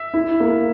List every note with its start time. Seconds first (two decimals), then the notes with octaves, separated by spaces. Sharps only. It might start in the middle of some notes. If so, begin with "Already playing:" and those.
Already playing: E5
0.14 E4
0.40 A#3